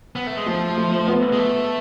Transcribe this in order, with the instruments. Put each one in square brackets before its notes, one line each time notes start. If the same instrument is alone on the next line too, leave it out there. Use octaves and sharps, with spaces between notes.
[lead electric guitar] B3
A3
G#3
[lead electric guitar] F3 [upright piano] A3
[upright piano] A3
B3
[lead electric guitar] G#3
A3